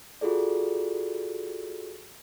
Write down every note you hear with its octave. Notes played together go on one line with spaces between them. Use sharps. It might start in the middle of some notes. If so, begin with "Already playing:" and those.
F4 F#4 G#4 A4 D5